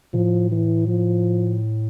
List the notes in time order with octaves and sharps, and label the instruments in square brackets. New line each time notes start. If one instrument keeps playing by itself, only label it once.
[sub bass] A2 [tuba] F3
[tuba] E3
F3